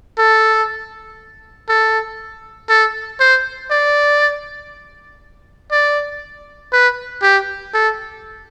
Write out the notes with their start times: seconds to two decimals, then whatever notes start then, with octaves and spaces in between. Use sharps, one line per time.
0.18 A4
1.69 A4
2.69 A4
3.20 C5
3.70 D5
5.71 D5
6.72 B4
7.22 G4
7.74 A4